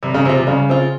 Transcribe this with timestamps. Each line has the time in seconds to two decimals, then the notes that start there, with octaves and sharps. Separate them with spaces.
0.03 C3 G3
0.14 C#3
0.25 C3 C4
0.29 F4
0.37 C3
0.47 C#3 G3
0.69 C4 F4